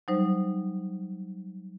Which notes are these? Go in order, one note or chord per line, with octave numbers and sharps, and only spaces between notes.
F#3 G3 D#4 C5